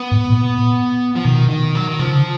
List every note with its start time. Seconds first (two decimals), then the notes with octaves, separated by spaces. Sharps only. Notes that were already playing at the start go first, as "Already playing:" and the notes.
Already playing: B3
0.12 G#2
0.30 A#2
1.16 F3
1.24 B2 D#3
1.49 D#3
1.75 F#3
1.88 D#3
1.99 C#3 F3